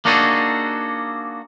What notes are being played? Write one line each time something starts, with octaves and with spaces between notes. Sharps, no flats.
A#3 D4 D#4 F#4 G#4 A4